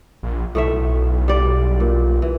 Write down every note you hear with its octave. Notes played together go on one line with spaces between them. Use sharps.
A#1
B1 A2 A3 E5
G3 D5
A#2
E3